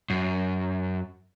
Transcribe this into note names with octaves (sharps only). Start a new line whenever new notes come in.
F#2